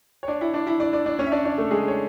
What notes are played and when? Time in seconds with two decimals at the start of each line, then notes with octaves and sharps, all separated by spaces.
0.23 C#5
0.28 D4 D5
0.41 E4 E5
0.54 D4 D5
0.67 E4 E5
0.80 D4 D5
0.93 D4 D5
1.06 D4 D5
1.19 C#4 C#5
1.26 E5
1.32 D4 D5
1.45 D4 D5
1.58 A3 A4
1.71 G#3 G#4
1.88 C#5